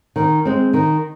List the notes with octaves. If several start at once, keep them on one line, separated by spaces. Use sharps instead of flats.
D#3
G#3 C4
D#3